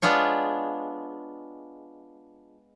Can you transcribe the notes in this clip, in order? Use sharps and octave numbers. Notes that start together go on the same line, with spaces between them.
G#3 B3 D4 F4 C#5